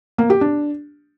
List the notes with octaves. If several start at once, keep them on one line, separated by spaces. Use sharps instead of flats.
A#3
G4
D4